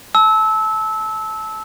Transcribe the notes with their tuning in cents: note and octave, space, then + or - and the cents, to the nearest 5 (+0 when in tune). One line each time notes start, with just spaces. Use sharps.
A5 -15 E6 -20